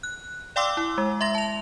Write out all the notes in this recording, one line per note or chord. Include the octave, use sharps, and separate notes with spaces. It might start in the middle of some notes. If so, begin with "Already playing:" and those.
F#6
D5 F5 G5 C6 D6 E6
E4
G#3
E5 C6 A#6
A5 F7